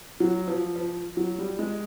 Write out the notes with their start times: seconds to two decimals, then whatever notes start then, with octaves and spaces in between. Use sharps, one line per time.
0.20 F#3
0.47 F3
0.76 F3
1.17 F#3
1.38 G3
1.59 G#3